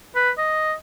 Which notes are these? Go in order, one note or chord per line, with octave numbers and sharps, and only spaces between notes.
B4
D#5